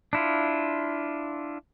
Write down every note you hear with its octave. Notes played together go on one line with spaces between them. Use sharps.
D4 E4 F4